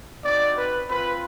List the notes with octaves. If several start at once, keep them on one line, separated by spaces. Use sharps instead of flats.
C4 D#4 F#4 D5
B4
C4 F4 B4